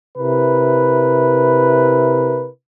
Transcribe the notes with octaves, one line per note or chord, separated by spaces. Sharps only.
C3 E4 A#4 B4